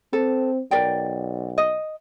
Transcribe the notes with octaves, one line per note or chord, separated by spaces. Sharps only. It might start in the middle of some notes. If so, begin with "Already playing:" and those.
C4 A4
B1 A#4 D5 G5
D#5